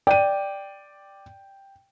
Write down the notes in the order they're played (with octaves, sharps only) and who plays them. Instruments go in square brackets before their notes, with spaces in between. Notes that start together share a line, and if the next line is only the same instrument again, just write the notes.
[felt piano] D5 D#7 [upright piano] G5